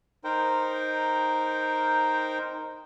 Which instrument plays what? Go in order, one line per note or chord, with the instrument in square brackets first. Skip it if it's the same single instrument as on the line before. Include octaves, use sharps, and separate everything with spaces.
[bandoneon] D#4 A#4 C5 G5